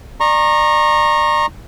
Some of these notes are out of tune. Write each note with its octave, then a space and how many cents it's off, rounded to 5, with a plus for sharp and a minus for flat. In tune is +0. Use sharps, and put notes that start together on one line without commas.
D5 +30 A#5 +0 C#6 -35